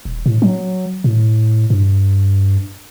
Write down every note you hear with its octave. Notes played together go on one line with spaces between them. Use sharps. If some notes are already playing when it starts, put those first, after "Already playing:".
D#1
A2
F#3
A2
G2